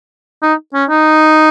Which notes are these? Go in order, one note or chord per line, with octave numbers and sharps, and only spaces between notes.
D#4
C#4
D#4